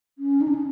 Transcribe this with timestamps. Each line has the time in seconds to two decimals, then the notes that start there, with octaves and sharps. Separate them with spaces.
0.19 C#4
0.41 D#4
0.48 D4
0.55 C#4